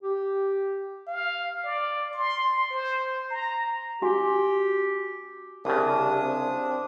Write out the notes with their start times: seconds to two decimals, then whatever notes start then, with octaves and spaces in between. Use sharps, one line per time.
0.02 G4
1.07 F5
1.65 D5
2.13 C6
2.70 C5
3.31 A#5
4.02 C#4 F#4 G4 G#5
5.65 C2 C#3 D4 G4 D#6
6.21 C4